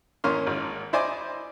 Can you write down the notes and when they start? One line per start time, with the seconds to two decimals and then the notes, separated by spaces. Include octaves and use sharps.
0.24 A1 A#3 C#4 C6 F6
0.47 G#1
0.93 E4 C5 D5 D#5 G#5 D6